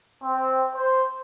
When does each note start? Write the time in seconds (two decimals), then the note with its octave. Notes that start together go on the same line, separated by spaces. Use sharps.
0.23 C4
0.75 C5